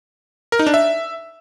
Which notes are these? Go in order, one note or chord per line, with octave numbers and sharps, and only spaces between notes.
A#4
D#4
D4
E5